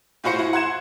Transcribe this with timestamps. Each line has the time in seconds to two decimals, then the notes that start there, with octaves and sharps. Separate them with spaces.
0.24 A2 F4 F#4 C5 C#7
0.39 E4
0.53 F#5 C6 G#6 E7